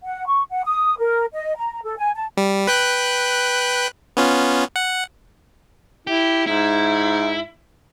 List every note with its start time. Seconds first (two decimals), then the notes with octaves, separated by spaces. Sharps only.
0.03 F#5
0.26 C#6
0.51 F#5
0.65 D#6
0.98 A#4
1.34 D#5
1.57 A#5
1.84 A4
1.98 G#5
2.15 A5
2.37 G3
2.67 B4 G5 F#6
4.17 B3 C#4 F4
4.76 F#5
6.07 E4 G4
6.47 G#2 E4